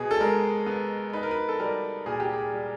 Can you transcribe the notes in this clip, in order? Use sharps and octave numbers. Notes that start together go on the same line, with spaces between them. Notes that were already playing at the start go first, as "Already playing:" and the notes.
Already playing: B2 B3 G#4
A4
G#3 A#4
B3
D#4 B4
A#4
B4
A4
G3 A#4
A#2 G#4
G4
G#4
G3